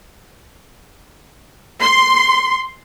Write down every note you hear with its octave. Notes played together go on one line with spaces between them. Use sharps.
C6